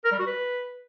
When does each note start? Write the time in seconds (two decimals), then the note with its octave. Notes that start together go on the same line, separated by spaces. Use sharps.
0.04 A#4
0.12 G3
0.19 F#4
0.26 B4